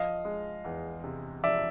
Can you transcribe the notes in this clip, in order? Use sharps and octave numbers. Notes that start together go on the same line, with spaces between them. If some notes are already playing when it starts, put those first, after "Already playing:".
Already playing: F3 D#5 F5
G#3
E2
C3
F3 D5 E5